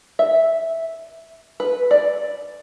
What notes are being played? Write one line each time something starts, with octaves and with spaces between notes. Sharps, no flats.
E5
B4
D5